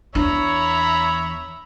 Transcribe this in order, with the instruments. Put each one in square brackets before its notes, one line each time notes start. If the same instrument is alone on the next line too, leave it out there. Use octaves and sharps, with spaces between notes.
[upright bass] E2 D4 [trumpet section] C#5 [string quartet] E5 A#5 B5